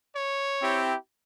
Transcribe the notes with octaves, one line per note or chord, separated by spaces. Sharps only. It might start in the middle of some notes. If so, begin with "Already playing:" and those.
C#5
C4 E4 G4